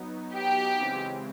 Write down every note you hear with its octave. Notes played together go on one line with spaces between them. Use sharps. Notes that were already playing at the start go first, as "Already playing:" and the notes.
Already playing: F#3 B3 D#4
G4
C#3 E3 G#3 C4